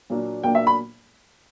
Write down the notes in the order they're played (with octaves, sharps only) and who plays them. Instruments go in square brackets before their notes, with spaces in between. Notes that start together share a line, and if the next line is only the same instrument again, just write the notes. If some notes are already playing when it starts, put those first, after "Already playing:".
[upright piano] A#2 F#3 A#3 D4
A#2 F#3 A#3 D4 G5
E5
B5